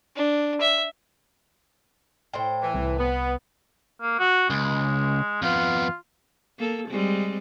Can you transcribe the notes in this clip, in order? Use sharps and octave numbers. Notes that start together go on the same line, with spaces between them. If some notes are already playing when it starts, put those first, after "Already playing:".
D4
E5
A2 C5 G5
E3
C2
B3
A#3
F#4
C#2 G#3
F2 B3 F4
A#3 A4
G3 G#3 C4